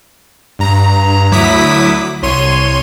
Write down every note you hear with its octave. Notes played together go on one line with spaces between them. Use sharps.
G2 A#5
D2 F#3 E4 D6 D#6 B6
C2 C#5 C6 D#7